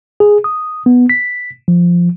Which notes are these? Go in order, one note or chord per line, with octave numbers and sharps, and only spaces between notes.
G#4
D#6
B3
B6
F3